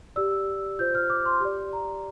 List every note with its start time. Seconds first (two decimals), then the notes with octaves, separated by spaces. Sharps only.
0.16 G4 D5 E6
0.79 F4 C5 G6
0.95 F6
1.10 D6
1.26 C6
1.41 G4 D5
1.73 A#5